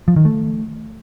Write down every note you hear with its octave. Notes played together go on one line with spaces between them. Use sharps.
F3
D#3
A3